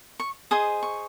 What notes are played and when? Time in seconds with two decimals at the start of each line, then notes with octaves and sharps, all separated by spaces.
0.20 C#6
0.51 G#4 C5 D#5 D#6
0.83 C#6